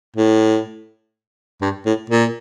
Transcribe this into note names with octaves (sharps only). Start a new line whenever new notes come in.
A2
G2
A2
A#2